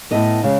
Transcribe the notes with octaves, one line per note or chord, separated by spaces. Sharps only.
A2 G#3 B3 D#5
C#3 G#3